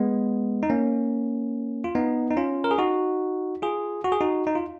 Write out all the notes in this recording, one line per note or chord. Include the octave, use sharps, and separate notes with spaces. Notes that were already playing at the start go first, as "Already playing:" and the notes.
Already playing: G#3 B3
D#4
A#3 C#4
F4
B3 D#4
D#4
C#4 F4
A#4
G#4
D#4 F#4
F4 G#4
F#4
G#4
D#4 F#4
D#4
F4